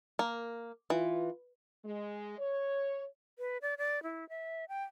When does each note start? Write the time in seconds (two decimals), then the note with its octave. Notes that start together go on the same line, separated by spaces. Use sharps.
0.19 A#3
0.90 E3 F4
1.85 G#3
2.39 C#5
3.38 B4
3.62 D5
3.78 D5
4.03 E4
4.29 E5
4.69 G5